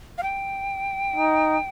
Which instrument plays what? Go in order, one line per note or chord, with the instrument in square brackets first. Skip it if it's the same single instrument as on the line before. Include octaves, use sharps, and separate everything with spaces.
[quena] F5
G5
[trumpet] D#4